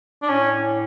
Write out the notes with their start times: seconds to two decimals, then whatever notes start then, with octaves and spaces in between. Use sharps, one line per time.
0.22 D4
0.28 A2 C#4